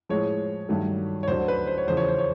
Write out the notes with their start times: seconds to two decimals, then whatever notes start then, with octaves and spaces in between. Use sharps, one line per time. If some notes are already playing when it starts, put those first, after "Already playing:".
0.09 A2 F3 G#3 C#5
0.69 G2 D#3 F#3 A3
1.23 C#5
1.28 D2 D3 F#3 C5
1.48 B4
1.67 C5
1.78 C#5
1.88 E2 C#3 F3 C5
1.97 C#5
2.08 C5
2.18 C#5